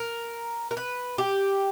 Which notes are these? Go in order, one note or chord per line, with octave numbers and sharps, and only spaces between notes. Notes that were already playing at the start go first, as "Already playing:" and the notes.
Already playing: A#4
A#4
B4
G4